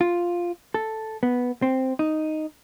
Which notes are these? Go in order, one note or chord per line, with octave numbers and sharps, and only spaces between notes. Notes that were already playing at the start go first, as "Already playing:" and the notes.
F4
A4
B3
C4
D#4